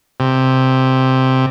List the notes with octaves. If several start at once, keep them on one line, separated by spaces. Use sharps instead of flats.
C3